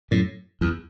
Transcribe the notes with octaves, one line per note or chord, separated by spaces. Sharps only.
F#2 A2
E2